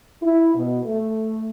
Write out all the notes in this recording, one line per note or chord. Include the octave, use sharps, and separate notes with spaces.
E4
B2
A3